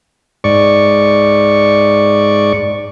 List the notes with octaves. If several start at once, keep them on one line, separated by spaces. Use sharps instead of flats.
G#2 D5 C#6